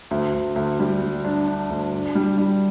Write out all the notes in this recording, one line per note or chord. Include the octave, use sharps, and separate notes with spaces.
D2
D2
D2
G3
G3
D4
D4
D2
D4
G3
G3